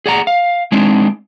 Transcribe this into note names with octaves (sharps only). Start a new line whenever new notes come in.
G#4 D5 F#5 A#5
F5
G#3 C4 D4 D#4